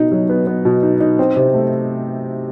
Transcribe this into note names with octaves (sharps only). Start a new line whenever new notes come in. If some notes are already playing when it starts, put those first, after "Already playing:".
Already playing: B2 D#4
F#3
B3
B3
B2
D#4
D#4
C4
C3
A3